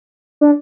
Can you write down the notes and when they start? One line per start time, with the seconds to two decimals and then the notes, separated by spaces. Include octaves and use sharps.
0.41 D4